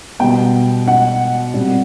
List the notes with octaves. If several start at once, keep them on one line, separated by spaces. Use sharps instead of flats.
B2 G3 B3 G5
F#5
A#2 G3 C4